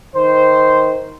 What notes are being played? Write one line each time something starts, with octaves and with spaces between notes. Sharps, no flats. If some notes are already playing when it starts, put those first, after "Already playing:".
D#3 C5